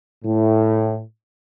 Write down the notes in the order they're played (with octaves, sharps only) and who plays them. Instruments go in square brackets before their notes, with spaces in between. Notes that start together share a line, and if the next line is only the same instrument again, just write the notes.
[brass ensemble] A2